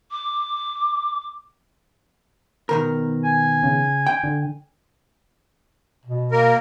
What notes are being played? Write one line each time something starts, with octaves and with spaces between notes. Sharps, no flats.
D6
B2 D#3 A#4
G#5
C#3
G5
D3
B2
A#3 A#4